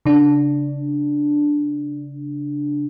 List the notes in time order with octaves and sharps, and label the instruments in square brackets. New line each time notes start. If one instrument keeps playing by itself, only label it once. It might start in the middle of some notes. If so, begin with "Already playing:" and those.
[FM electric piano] C#3 D4